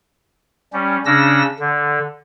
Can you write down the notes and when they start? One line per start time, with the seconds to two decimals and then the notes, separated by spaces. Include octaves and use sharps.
0.73 G3 C#4
1.06 C#3 C#4 D4 E6 A#6
1.60 D3